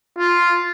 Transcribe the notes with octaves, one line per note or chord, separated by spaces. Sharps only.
F4